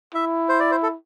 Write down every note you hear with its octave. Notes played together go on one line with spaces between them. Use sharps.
E4 E5
C5
D5
C5
A4